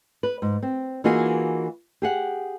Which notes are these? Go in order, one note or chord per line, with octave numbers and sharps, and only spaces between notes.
B4
G#2
C4
E3 A#3 D#4 F4 F#4 G#4
G4 G#4 F#5